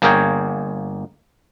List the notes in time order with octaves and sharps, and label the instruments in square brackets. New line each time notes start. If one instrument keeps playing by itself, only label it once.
[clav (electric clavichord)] G1 A#3 G#4 A#4 C#5 G5